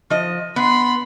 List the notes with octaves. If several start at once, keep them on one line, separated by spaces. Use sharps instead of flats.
F3 D#5
B3 B5 C6